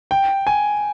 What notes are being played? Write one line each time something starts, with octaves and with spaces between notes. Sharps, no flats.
G5
G#5